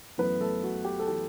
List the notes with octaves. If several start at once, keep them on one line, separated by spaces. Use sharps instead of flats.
F#2 E3 A3 B3 B4
A3 A4
F#4
G4
A4
E3 A3 G4